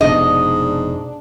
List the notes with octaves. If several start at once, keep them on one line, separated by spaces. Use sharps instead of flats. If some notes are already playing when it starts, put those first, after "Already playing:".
F1 G#2 B2 D4 D#5